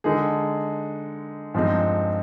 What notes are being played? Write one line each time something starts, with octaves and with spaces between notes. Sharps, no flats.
D3 G#3 D#4 G#4
G2 F3 G#3 C4 D#4